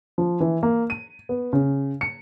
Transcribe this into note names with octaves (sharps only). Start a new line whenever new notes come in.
F3
E3
A#3
D#7
B3
C#3
C#7